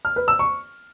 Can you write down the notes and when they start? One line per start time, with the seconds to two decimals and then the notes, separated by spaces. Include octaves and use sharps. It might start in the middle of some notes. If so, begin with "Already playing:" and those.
0.05 F6
0.16 B4
0.28 E6
0.39 C#6